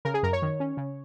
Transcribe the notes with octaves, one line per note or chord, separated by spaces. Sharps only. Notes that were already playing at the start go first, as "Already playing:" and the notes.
C#3 A#4
G#4
F#2 A#4
C#5
D#3
C#4
C#3